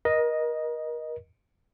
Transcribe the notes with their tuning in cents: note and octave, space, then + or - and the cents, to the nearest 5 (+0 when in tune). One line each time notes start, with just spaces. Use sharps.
A#4 +35 D#5 +0